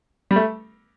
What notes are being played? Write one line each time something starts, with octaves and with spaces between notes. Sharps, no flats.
G3
A3